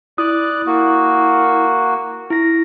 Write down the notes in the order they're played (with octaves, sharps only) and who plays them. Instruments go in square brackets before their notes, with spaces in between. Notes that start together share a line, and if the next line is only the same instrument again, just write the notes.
[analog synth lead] E4 [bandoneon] D5 F#6 [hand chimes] D#6
[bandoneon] A#3 F#4
[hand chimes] E4 A#6